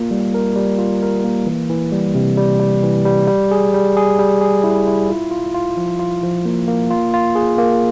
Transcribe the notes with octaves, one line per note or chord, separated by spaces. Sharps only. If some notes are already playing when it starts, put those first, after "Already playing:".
Already playing: A#3 F4
G3
A#4
G3
F4
A#4
A#3
E3
E3
G3
C3
G3
G3
E3
G3
G3
G#4
G3
G#4
G3
G#4
E4
E4
F4
F4
F4
F3
F4
F3
A#3
A#3
F4
F4
G#4
A#3